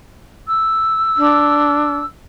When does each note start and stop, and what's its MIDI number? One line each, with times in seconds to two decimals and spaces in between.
0.47 2.06 88
1.18 1.98 62